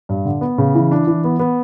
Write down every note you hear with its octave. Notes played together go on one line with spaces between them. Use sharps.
G2
D3
B3
C#3
E3
D4
E3
B3
B3